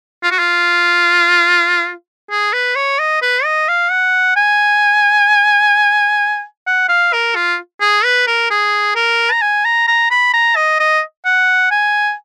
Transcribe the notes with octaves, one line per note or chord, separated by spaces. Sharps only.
F4
F#4
F4
G#4
B4
C#5
D#5
B4
D#5
F5
F#5
G#5
F#5
F5
A#4
F4
G#4
B4
A#4
G#4
A#4
A#5
G#5
A#5
A#5
B5
A#5
D#5
D#5
F#5
G#5